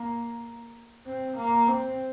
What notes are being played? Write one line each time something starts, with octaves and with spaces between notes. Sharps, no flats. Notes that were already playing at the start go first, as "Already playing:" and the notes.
Already playing: A#3
C4
A#3
C4